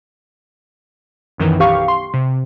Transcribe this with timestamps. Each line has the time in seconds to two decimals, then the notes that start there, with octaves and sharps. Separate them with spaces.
1.38 B1 F#2 D#3 E3
1.60 B1 G4 F5 C#6
1.88 C6
2.14 C3